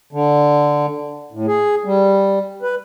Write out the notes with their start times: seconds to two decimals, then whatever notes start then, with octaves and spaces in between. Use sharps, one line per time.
0.13 D3
1.32 A2
1.47 G#4
1.85 G3
2.62 B4